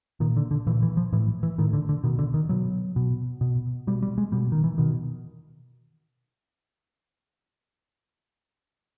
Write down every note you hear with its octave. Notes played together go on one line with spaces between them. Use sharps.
A#2 D#3
D3
D3
A#2 E3
E3
F3
A2 E3
E3
A2 D#3
D3
D3
B2 D#3
D3
D#3
B2 F#3
B2
B2
B2 G3
G3
G#3
B2 G3
D#3
E3
B2 D#3